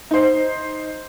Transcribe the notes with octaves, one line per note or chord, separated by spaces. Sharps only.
D#4 C5